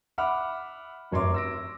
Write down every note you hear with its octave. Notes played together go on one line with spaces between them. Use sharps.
E5 F#5 B5 D6 F6
F1 F#2 C#5 C6 D6
E6 A#6 D7